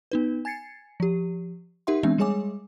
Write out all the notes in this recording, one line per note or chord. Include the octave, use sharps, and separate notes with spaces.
B3 D#4 B4
G#5 G#6 A6 C7 C#7
F3 G4
D#4 G4 A#4 E5 F#5 C6
E3 G#3 B3 C4 D4 E5
G3 G#3 G#4 C#5 G#5 D6